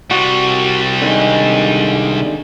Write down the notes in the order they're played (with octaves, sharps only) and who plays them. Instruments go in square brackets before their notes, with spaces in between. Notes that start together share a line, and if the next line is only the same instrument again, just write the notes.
[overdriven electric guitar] C3 G3 [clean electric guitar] F#4
[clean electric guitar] D3 D#3 G#3